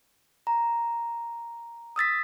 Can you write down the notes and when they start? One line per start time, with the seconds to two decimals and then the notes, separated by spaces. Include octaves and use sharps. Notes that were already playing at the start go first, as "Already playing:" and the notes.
0.47 A#5
1.96 D#6 E6 A6 B6